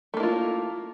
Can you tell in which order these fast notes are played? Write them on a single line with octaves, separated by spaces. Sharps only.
A3 A#3 E4 F4